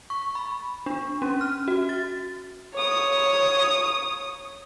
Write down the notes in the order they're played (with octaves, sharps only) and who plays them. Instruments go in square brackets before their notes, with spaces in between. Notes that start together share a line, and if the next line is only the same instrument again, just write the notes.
[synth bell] C#6
B5
D4
C#4
F6
F#4
A6
[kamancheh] C#5 D#6